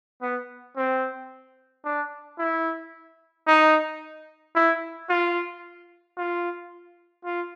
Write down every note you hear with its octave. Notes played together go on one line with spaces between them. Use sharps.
B3
C4
D4
E4
D#4
E4
F4
F4
F4